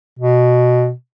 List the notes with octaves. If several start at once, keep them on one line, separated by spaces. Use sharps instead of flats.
B2